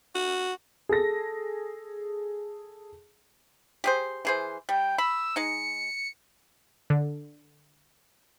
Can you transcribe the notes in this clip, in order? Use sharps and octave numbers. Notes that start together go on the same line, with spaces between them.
F#4
G#4 A4 A#6
G4 G#4 C5
E3 G#4 C5
G3 G5
B5 E6
G#3 D#4 C#7
D3